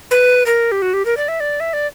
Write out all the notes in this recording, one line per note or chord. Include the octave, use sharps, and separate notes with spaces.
B4
A#4
G4
F#4
G4
A#4
D5
E5
D5
E5
D5